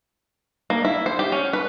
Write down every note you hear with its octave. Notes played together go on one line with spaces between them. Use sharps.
A#3
E4
C5
G4
C#4
B4